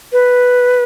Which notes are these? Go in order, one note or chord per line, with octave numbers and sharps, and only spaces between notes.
B4